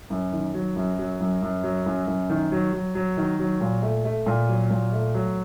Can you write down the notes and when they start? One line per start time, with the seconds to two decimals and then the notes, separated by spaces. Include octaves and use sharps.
0.10 F#2
0.32 D#3
0.54 F#3
0.76 F#2
0.98 F#3
1.20 F#2
1.42 F#2
1.63 F#3
1.86 F#2
2.07 F#2
2.30 D#3
2.52 F#3
2.73 F#3
2.95 F#3
3.17 D#3
3.39 F#3
3.61 A#2
3.82 A3
4.05 A3
4.26 A#2
4.49 F#3
4.71 A#2
4.92 A3
5.14 F#3